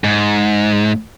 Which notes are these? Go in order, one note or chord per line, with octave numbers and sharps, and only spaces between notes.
G#2